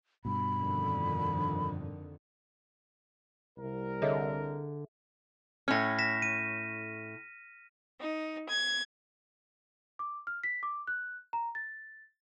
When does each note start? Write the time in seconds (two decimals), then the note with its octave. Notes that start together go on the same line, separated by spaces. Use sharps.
0.25 G2 B2 B5
0.59 F2 D3 D#3
3.58 C2 A#4
4.02 D3 G#4 A4 C#5 D#5 E5
5.68 A2 C#4 F6 A#6
5.98 A#6 B6 E7
6.22 D#7
8.00 D#4
8.47 G#6
9.99 D6
10.27 F6
10.44 B6
10.63 D6
10.87 F#6
11.33 A#5
11.55 A6